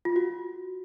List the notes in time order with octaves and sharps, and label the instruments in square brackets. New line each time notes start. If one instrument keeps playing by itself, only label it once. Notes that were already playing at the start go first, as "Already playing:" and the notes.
[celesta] F4
F#4